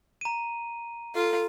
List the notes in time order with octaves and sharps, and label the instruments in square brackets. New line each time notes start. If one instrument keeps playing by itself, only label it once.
[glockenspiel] A#5 D#7
[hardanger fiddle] F4 F5 [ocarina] A4